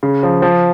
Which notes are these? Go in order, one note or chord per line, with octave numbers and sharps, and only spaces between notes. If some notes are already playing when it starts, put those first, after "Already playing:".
C#3
F3
F3